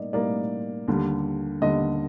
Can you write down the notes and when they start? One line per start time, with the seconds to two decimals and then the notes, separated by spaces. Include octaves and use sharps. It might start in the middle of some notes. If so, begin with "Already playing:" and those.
Already playing: A2 G3 A#3 D#4 D5 D#5
0.13 A2 G3 A#3 D#4 D5
0.88 D#2 D3 G3
1.61 D#2 D3 G3 D#5